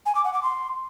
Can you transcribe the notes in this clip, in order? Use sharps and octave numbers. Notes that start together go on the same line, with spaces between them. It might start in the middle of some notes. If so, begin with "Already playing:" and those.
G#5
D6
F#5
D6
C6